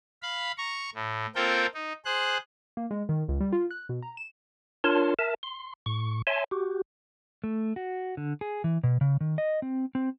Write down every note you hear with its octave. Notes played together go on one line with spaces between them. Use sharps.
F5 B5
A#5 C#6
A2
A#3 C4 F4 A4 A#4 G5
D#4
G#4 C5 F#6
A#3
G#3
D#3
C#2
G3
F4
F#6
B2
A#5
E7
D4 F4 A#4 C#5 A5 C6
A#4 E5 A5
C6
A2 C#6
C#5 E5 G#5 A5 C6
F#4 G4
A3
F#4
D3
G#4
E3
B2
C#3
D#3
D#5
C4
C4